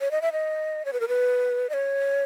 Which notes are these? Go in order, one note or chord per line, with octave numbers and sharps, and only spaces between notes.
C#5
D#5
E5
D#5
C#5
B4
A#4
B4
D#5
C#5